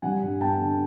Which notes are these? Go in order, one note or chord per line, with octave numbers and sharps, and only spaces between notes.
G3 F#5 G#5
G2
B3 G5 A5
D3